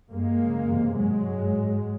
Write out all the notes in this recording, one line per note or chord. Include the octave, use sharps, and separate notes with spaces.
G2 G#3 A#3
F#2 C#3
E2 C3
G#2 F#3 G#3
G2
G#2